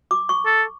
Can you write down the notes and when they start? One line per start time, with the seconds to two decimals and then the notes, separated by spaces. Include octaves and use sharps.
0.11 D6
0.29 C#6
0.46 A4